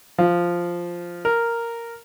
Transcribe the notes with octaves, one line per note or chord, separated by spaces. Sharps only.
F3
A#4